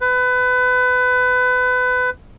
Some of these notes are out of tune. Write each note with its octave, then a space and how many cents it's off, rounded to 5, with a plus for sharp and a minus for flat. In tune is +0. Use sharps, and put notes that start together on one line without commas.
B4 +25